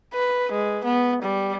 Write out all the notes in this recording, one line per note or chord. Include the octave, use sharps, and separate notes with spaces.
B4
G#3
B3
G3